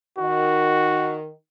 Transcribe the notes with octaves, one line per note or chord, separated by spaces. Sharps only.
D#3 F#4